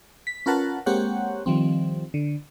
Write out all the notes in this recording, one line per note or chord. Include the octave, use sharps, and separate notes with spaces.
B6
C#4 F4 A#4 B4 F#5 A5
G#3 A#3 C4 G4 C#5 F#5
D#3 F3 G3 C4
D3